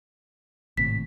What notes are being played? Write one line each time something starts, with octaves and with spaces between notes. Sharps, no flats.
G#1 A2 C3 B6